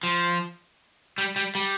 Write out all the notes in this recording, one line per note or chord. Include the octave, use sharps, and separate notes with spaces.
F3
G3
G3
G3